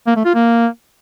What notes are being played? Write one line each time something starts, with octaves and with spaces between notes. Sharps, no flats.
A#3
A3
F4
A#3